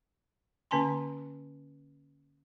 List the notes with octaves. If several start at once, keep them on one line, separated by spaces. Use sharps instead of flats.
D3 A#3 C#4 G#5 A5 C6